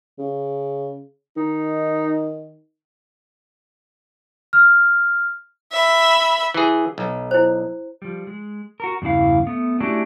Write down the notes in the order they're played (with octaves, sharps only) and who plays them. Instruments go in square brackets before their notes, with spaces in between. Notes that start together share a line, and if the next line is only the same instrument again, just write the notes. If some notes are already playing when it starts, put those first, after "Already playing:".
[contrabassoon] C#3
[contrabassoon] D#3 [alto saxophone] D#4
[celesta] F6
[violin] E5 B5
[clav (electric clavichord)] E3 G#4
B1
[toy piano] E4 C5
[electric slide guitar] F3 G3
G#3
F#4 A#4
E2 G2 C#3 E4 F5
A3 B3
A3 C#4 D4 E4 F#4 G4